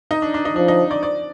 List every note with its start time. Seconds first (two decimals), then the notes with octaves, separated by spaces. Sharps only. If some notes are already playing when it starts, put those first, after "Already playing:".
0.11 D#4
0.22 D4
0.34 D4
0.45 D#4
0.56 F3 D4
0.68 D#4
0.91 D5
1.03 D5